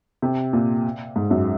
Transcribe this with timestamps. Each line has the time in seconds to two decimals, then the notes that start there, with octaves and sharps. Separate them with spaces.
0.22 C3
0.53 A#2
1.16 G#2
1.31 F#2